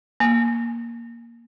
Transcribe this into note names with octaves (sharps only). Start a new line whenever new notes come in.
A#3